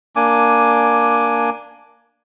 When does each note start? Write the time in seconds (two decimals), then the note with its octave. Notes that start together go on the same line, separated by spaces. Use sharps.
0.16 A#3 D4 G#5 D6